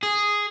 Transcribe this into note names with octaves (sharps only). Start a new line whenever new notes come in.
G#4